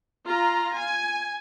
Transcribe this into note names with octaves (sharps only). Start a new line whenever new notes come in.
F4 A#5
G#5